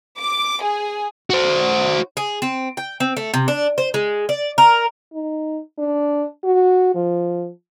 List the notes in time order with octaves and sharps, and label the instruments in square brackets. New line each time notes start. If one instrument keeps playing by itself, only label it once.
[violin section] D6
G#4
[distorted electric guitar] F#4 C5
[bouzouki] G#4
C4
G5
C4
A3
C3
D4
C5
G#3
D5
A#4
[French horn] D#4
D4
F#4
F3